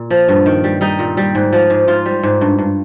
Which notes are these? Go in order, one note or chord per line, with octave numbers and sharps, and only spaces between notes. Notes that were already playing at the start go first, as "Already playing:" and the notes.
Already playing: A#2
F3
G2
D#3
G3
G3 D#4
A#2
G3
G#2
F3
G#2
G#2 F4
G3
G#2
G2
G2